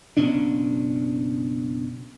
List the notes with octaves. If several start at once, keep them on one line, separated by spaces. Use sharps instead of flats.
F#1 B2 C#4 D4